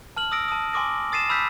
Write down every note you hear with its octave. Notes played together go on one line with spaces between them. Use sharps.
A5 F6 F#7
D#6 E6 A#6 D7
A5 D#6
G#5 C6 D6 D#6 A#6
D#6 A6 C7 D#7 E7
B5 E6 F6 G6 B6